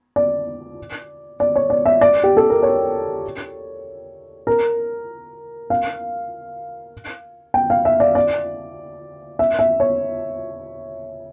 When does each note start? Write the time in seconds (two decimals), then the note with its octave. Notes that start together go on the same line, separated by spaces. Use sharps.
0.16 D5
1.40 D5
1.56 C#5
1.70 D5
1.85 E5
2.01 D5
2.23 G4
2.37 A4
2.50 A#4
2.63 C#5
4.47 A#4
5.70 F5
7.54 G5
7.70 F5
7.85 E5
8.00 D5
8.15 D5
9.39 E5
9.59 E5
9.80 C#5